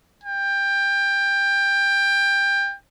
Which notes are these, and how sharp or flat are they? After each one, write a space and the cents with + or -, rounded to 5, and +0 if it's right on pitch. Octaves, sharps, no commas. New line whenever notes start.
G5 +20